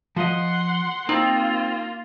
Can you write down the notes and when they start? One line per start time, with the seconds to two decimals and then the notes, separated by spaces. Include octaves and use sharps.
0.16 F3 D#5 F#5 C6
1.09 A#3 C4 D#4 F4